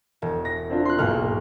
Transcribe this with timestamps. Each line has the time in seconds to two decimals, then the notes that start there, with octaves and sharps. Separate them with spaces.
0.22 E1
0.45 A#6
0.70 C4 D4 F4
0.85 C6 F#6
0.99 B1 G#2 B2 A#3 F6